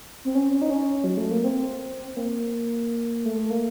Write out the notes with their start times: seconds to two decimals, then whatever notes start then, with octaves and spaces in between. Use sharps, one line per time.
0.25 C4
0.35 C#4
0.53 C#4
0.62 D#4
0.70 C#4
1.04 F#3
1.17 A3
1.31 A#3
1.44 C4
2.06 C4
2.17 A#3
3.25 A3
3.38 A3
3.50 A#3